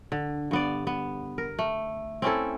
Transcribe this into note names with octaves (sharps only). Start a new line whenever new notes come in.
D3
G2 B3 D5
B3
A#4
A3
C4 C#4 E4 A4